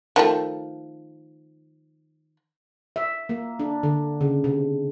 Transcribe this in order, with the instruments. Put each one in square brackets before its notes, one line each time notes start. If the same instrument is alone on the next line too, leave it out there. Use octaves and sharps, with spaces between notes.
[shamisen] D#3 F3 A3
[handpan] E5
A#3
D4
D3
C#3
C3